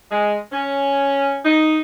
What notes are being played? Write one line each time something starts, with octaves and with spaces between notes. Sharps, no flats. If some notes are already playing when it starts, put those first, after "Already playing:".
G#3
C#4
D#4